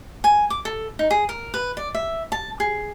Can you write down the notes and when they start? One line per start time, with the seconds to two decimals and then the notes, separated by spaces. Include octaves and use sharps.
0.24 G#5
0.50 D6
0.65 A4
0.99 D#4
1.11 G#4
1.29 A#4
1.54 B4
1.77 D5
1.95 E5
2.32 A5
2.60 G#4